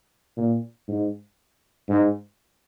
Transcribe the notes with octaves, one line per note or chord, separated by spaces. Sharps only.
A#2
G#2
G#2